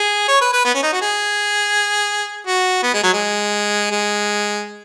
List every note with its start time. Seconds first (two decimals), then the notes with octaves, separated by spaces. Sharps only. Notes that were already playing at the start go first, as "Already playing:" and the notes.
Already playing: G#4
0.28 C#5
0.41 B4
0.53 B4
0.65 B3
0.75 C#4
0.83 D#4
0.93 F#4
1.02 G#4
2.47 F#4
2.83 B3
2.94 G#3
3.04 F#3
3.14 G#3
3.91 G#3